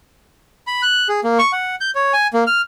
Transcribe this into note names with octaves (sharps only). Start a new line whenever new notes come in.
B5
F#6
G#4
A#3
C#6
F#5
G6
C#5
G#5
A#3
F6